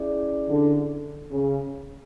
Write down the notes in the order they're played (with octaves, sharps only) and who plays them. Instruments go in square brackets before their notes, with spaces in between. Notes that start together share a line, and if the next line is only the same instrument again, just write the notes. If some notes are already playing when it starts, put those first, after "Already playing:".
Already playing: [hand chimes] C#4 E4 G#4 D5
[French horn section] D3
C#3